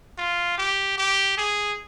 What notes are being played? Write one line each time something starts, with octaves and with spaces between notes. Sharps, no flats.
F4
G4
G4
G#4